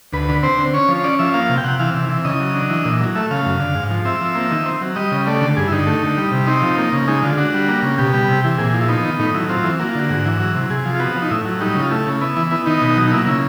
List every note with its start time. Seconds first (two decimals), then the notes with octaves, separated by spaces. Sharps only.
0.13 D2 B4
0.29 D3
0.43 C4 C5
0.58 D3
0.74 C#4 C#5
0.89 F3
0.95 C#5
1.04 C#4 D5
1.19 F3 E5
1.34 A#3 F5
1.49 C3
1.58 G5
1.64 C3 F#5
1.79 E3 F5
1.94 C3
2.09 E3
2.25 C#3 D#5
2.40 F#3
2.54 D4
2.70 E3
2.85 A#2
3.00 F#3
3.16 A3 E5
3.31 C#3 F5
3.46 F#2
3.60 D3
3.75 G#2
3.90 F3
4.05 C4 E5
4.21 F3
4.35 A#3
4.51 D#3
4.66 C4
4.81 F#3
4.96 G3 D#5
5.12 C#3
5.27 A3 D5
5.41 D3
5.57 G2 G#4
5.68 E4
5.72 D3 D#4
5.87 A3
6.03 D3
6.17 G3
6.32 C3
6.47 C4 D#4
6.62 F3
6.78 A#3
6.92 C#3
7.08 G#3 D#4
7.23 D3 F4
7.37 D4 F#4
7.54 G3
7.68 A#3
7.83 C#3
7.98 B2 G4
8.13 G3
8.28 C3
8.44 E3
8.58 A#2 G#4
8.74 F3
8.81 E4
8.88 B3 D#4
9.04 D#3
9.19 A2 D#4
9.34 F#3 E4
9.49 C4 F4
9.64 E3
9.79 A#3 F#4
9.89 F4
9.95 D3 F#4
10.09 G#2 F#4
10.25 E3
10.40 F#3
10.55 C3
10.70 C3 G#4
10.85 F3
10.95 F4
11.00 B3 F#4
11.16 F3
11.22 D#4
11.31 A2 E4
11.45 F#3
11.60 G3 D#4
11.75 C#3
11.83 F4
11.90 A3 E4
12.07 C#3
12.21 B3 E4
12.37 E3
12.51 B3 E4
12.66 D#3 D#4
12.82 B2
12.96 F#3
13.05 D#4
13.12 A#3 E4
13.27 C#3 E4